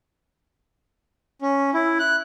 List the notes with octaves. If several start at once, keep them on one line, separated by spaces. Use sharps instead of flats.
C#4
E4
F#6